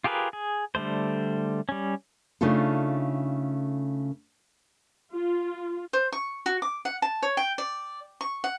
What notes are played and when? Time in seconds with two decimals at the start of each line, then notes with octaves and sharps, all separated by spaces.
0.04 F4 G4 G#4 A#4 B4
0.33 G#4
0.75 D3 G3 A3 C5
1.69 G3 C#4
2.41 C#3 A3 D4 D#4 F4 A4
5.13 F4
5.93 C5
6.12 C#6
6.46 F#4
6.62 D6
6.85 F#5
7.02 A5
7.22 C#5
7.37 G5
7.58 D5
8.21 C#6
8.44 F#5